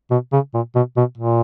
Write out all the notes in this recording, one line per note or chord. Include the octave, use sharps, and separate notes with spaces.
B2
C#3
A#2
B2
B2
A#2